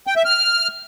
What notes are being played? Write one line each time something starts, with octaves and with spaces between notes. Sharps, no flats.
G5
E5
F6